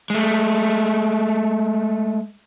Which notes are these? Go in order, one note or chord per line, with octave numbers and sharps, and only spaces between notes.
G#3 A3